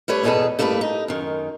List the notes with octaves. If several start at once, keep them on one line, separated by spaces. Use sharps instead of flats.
G3 A3 B4 C#5
E2 G#2 B2 G#4 A4 B4
G2 A3 A#3 E4 A4 B4
D#4
F#2 D#3